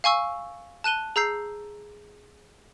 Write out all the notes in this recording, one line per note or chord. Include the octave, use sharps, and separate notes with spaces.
F5 G#5 C#6 E6
A5 F#6 D#7 G7
G#4 A#5 E6 G6 C7